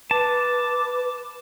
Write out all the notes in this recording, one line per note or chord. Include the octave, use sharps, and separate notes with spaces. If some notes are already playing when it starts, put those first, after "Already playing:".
B4 A5 D6